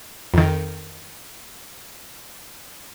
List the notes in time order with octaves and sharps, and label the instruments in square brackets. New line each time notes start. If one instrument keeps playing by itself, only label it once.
[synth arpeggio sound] F2 D#3